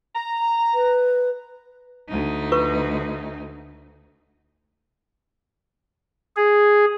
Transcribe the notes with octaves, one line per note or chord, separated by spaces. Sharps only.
A#5
B4
D2 D#4
F4 B4 C#6
G#4